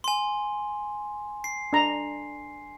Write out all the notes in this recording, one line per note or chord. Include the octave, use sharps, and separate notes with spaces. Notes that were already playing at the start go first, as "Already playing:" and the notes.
G#5 C6
C7
D4 A#5